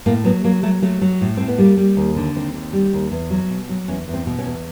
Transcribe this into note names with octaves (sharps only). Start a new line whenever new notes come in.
A2 A#3
F#3 B3
F#3 A#3
F#3 A3
F#3 A3
F#3
A2
A2 C4
B3
G3 A#3
G3
D#2
D3
D#2 C4
D#2
G3
D#2
E2
F#3
B2
F#3
E2 C#4
E2
C4
B2
C#4
E2